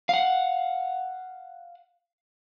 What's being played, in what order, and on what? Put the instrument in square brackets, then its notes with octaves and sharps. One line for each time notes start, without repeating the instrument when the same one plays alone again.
[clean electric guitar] F5 F#5